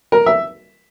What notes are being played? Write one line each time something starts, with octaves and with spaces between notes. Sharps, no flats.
A#4
E5